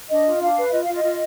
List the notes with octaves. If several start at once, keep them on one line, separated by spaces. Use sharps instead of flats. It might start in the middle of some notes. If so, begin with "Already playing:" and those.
D4 D#5
F4
D4 F5
B4
F4 D#5
F5
F4 D#5
F4